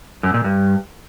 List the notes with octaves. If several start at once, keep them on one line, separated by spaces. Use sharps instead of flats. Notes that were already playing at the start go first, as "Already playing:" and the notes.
F#2
A#2
G2